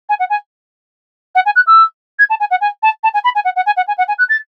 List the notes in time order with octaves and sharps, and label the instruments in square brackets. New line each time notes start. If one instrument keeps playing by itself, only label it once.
[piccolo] G#5
F#5
G#5
F#5
G#5
F#6
E6
G#6
A5
G#5
F#5
G#5
A5
A5
G#5
B5
G#5
F#5
F#5
G#5
F#5
G#5
F#5
G#5
F#6
A6